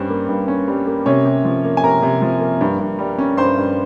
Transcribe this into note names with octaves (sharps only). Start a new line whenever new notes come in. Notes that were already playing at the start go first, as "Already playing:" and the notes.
Already playing: G2 G3 C#4 C5
A#3
G2
C#4
G3
A#3
C3 C#4 C#5
C3
F3
A#3
G#5
C3 A#4 A#5
C3
F3
A#3
G2
G2
G3
C#4
G2 C5 C6
G2